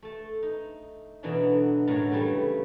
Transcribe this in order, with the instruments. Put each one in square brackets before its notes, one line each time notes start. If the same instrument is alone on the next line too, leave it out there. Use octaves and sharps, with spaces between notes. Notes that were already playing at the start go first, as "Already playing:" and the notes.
[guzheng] A3 A5
D#4
B2 D3 E3 F#3 D4 D#4
F#2 A2 D3 F#3 C#5
C#3 E3 G3 A3